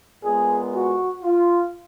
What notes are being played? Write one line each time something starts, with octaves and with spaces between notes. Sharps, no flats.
A#2 G#3 B3 G#4
F#4
F4